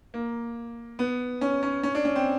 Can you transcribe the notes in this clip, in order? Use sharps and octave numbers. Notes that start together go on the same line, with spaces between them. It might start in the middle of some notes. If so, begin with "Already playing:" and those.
A#3
B3
C#4
C#4
C#4
D4
C#4
C4